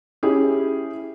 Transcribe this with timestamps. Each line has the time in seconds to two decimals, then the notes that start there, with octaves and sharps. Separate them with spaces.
0.23 C#4 E4 G4 G#4